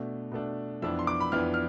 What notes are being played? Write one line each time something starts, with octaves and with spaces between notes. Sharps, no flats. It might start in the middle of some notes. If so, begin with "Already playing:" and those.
Already playing: B2 A3 D4
B2 A3 D4
F2 E3 B3 D4 E6
C6
D6
B5
F2 E3 B3 D4 F6
F6